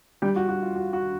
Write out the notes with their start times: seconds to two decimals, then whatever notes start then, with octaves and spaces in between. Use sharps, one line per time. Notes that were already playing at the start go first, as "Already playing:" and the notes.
0.22 G3 G4
0.36 F#4
0.49 F#4
0.63 F4
0.76 F#4
0.93 F#4